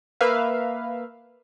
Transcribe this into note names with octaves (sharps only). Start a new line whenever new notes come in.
A#3 B4 E5 F5